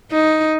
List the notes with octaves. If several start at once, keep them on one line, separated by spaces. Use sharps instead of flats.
D#4